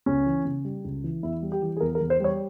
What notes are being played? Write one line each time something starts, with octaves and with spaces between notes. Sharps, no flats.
C#2 C#4
E3
C#3
G3
C#2
E3
E2 E4
G3
G4
E3
G#4
E2 A#4
A#4
E2
C5
G3 C#5